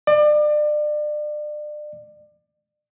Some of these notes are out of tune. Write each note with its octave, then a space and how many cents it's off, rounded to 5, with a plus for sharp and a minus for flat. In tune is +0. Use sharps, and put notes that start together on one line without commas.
D5 +35